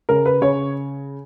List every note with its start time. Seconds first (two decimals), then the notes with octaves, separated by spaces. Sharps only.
0.09 C#3 A#4
0.26 B4
0.42 C#3 C#5